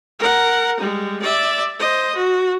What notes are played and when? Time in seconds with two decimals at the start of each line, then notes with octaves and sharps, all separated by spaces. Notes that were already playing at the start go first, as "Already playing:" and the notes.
0.19 A#4 F#5
0.80 G3 G#3
1.22 D5 E5
1.79 C5 D#5
2.15 F#4